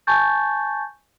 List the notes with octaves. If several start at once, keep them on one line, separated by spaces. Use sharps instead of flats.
G#5 A5 C#6 G6 A6